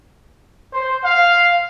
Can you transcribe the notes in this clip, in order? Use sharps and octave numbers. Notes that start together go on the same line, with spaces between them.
C5
F5